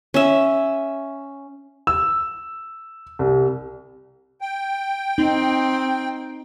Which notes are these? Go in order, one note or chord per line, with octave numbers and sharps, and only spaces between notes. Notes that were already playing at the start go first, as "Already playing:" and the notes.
C#4 E5
E6
C2
G5
C4 D#4